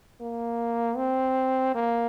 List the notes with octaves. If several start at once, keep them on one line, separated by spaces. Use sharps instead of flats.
A#3
C4
A#3